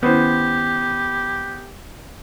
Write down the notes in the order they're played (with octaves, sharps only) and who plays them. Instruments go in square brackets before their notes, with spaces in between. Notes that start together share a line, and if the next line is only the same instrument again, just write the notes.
[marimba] D#3 C#4 E4 [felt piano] B3 C5 [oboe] G4